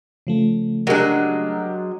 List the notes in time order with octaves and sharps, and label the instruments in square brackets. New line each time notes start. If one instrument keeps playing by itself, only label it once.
[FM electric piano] C#3 F3 A3
[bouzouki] F#3 G#3 [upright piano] D4 G4 A#4